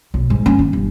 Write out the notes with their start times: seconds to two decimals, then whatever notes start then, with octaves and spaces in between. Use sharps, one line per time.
0.14 B1
0.30 G#2
0.46 C#4
0.59 D#3
0.73 G1